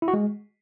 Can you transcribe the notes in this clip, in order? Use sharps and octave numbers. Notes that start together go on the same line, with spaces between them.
E4
F#4
G#3